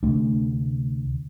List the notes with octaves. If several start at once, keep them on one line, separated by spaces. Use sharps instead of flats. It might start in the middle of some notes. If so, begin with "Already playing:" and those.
D2 C3 A3 D4